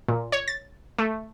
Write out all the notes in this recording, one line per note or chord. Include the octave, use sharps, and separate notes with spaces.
A#2
C#5
A6
A3